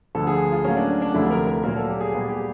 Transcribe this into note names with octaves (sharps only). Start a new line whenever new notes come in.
D2 D3 F3 A4
G#4
F4
A2 F#3 A#3 C#4
D4
D4
D2 C3 F3 A3 E4
A#4
A#4
A#2 F#3 A#3 A#4
A4
G4
G#4
A#2 G3 B3 G#4
G4